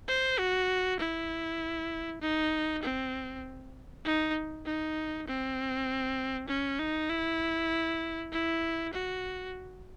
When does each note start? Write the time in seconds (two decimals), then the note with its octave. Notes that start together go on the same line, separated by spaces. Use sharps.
0.08 C5
0.39 F#4
1.00 E4
2.21 D#4
2.83 C4
4.05 D#4
4.65 D#4
5.27 C4
6.49 C#4
6.79 D#4
7.09 E4
8.32 E4
8.93 F#4